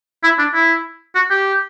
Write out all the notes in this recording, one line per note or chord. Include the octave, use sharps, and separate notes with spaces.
E4
D4
E4
F#4
G4